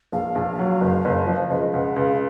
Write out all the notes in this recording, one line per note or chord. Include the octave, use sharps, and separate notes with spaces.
A#1 F5
A#1
F#3
F#1
F#1
F3
C#2 D#5
C#2 F#5
C#2 F5